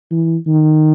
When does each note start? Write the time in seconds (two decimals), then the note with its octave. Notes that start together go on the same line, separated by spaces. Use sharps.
0.11 E3
0.47 D#3